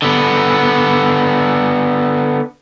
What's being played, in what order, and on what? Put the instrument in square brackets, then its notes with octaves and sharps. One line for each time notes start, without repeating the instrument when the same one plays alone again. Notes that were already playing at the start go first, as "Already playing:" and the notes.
[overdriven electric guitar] D3 B3